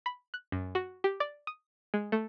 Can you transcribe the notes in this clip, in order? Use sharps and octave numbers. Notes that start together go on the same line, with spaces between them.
B5
F#6
F#2
F#4
G4
D5
D#6
G#3
A3